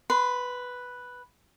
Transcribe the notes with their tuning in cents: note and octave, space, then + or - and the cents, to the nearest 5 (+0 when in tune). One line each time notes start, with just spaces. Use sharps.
B4 +0 C6 -30